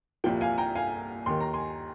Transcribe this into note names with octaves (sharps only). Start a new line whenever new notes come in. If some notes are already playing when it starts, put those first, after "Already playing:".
C2 A#2 F3 G5
F5 G#5
G5 A#5
F5 G#5
D#2 D#3 C6
A#5
G#5 C6